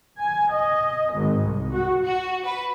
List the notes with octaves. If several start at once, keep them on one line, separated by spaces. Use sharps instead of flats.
G#5
D#5
G#1
C2
F#4
F#4
B4